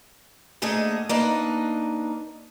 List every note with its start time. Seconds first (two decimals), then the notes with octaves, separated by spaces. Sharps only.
0.62 G#2 D3 A3 A#3 G#4 D#5
1.09 A#3 D4 D#4 B4